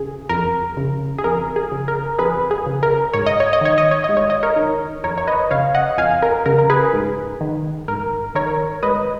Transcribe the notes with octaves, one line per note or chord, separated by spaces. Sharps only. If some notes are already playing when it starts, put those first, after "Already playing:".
Already playing: C#3 G#4
F2 A#4
C#3
G#4
F2 A#4
G#4
C#3
A#4
F2 G#4 B4
G#4
C#3
A#4
G#2 C#5
D#5
C#5
D#5
D#3 C#5
D#5
C#5
G#2 D#5
C#5
D#5
A#4 C#5
D#3
F2 A#4 C#5
C#5
B4 D#5
C#3 C#5 F5
D#5 F#5
F2 F5 G#5
A#4
C#3 A#4
A#4
G#4 B4
G#2
D#3
G#2 A#4
D#3 A#4 C#5
G#2 B4 D#5